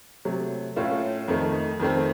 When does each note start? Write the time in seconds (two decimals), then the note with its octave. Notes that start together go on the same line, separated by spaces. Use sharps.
0.25 C3 F#3 A3
0.76 A2 A3 C#4 F4
1.28 F2 D#3 A3 D#4
1.80 F2 D#3 A3 C4